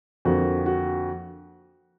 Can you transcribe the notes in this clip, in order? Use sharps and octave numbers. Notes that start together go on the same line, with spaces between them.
F2 D3 F3 A#3 F#4
F#4